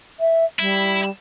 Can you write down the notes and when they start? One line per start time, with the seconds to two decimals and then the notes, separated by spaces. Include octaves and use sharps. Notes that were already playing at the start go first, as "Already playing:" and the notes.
0.19 E5
0.59 G3 E4